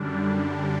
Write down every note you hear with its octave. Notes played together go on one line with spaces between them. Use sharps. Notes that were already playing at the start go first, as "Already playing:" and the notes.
Already playing: F#2 D3 G3 D4